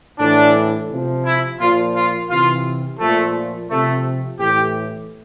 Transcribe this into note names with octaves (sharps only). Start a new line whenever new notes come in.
A2 E3 D4
C3 F3
E4
A#2 F3 F4
F4
C3 E3 F4
A#2 F3 A3
C3 F3 A3
A2 E3 G4